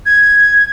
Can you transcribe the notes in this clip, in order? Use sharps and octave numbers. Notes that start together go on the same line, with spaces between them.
G#6